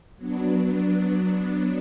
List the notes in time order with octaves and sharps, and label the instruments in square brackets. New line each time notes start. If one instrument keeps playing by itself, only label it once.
[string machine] F#3 B3 D4